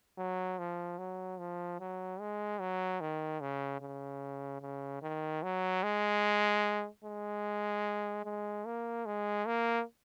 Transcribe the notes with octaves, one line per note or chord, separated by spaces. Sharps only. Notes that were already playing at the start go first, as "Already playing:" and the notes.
F#3
F3
F#3
F3
F#3
G#3
F#3
D#3
C#3
C#3
C#3
D#3
F#3
G#3
G#3
G#3
A#3
G#3
A#3